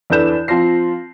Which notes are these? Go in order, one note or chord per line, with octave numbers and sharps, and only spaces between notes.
E2 D4 A4 B4 G6 E7
F3 C4 A#6 C7